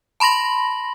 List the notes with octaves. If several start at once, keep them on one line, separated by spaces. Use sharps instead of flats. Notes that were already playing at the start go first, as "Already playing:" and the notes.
A5 B5 C6 A#6 F#7